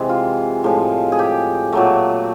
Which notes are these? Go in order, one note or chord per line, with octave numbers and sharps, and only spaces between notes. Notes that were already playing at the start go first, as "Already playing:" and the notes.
Already playing: C3 E3 G#3
F4
A2 F3 G#3
G#4
G4
A#2 F#3 A3